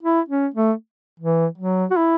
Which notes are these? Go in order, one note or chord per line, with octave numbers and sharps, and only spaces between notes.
E4
C#4
A3
E3
F#3
F#4
E4